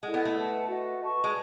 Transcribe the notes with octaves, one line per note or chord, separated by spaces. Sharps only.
G#3 E4 A4 D#5 F#5
B3
A3
B4 F#5 A5
F#4 B4 D#5 F#5
B4 D#5 A5 C#6
G#3